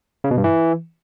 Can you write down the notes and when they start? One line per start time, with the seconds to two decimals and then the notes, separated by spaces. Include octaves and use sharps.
0.24 C#3
0.31 B2
0.37 G2
0.44 E3